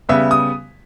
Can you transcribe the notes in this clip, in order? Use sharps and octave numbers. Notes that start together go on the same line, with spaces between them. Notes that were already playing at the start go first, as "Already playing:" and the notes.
C#3 G3 B3 E5
D#6